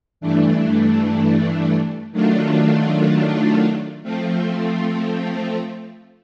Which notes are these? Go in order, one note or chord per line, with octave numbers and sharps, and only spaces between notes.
G2 E3 A3 D4
D#3 F#3 A3 D4 F4
F3 A3 C4 F4